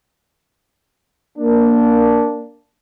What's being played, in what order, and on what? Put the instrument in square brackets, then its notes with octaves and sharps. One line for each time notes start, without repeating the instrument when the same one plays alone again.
[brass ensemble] A#3 D4